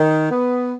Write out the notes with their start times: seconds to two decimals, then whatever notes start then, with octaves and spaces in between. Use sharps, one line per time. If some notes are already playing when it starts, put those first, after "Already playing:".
Already playing: D#3
0.30 B3